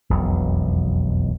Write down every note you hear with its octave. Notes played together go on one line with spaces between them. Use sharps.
E1 B1 F2